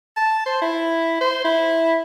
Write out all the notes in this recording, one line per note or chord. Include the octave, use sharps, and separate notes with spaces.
A5
C5
E4
C5
E4